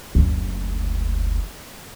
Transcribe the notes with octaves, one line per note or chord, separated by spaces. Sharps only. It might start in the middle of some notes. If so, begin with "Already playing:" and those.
F#1 D2